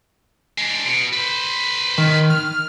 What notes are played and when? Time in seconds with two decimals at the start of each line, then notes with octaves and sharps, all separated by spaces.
0.58 G#3 D4
0.85 B2
1.13 B4 C5
1.98 D#3
2.30 F6